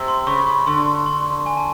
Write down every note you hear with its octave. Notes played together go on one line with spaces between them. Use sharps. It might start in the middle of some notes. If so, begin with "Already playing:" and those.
Already playing: C3
C6
C#3 C#6
C6
D3 C6
C6
G#5
A5